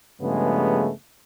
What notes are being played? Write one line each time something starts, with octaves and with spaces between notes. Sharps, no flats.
G2 C#3 F3 G#3 A3 B3